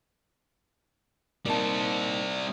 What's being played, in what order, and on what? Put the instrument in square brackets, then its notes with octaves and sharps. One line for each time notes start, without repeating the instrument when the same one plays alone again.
[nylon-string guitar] A#2 D#4 A5 [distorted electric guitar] G3 C4